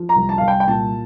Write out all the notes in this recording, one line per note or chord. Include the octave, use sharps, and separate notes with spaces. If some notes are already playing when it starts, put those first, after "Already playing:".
Already playing: F3
A#5
C2
A5
C2 F5
G5
G5
A#2 A5